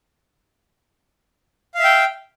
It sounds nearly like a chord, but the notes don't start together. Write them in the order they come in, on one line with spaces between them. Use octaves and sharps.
F5 E5 G5